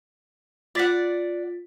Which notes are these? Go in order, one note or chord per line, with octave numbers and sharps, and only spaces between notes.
F4 D5 F#5 A6 B6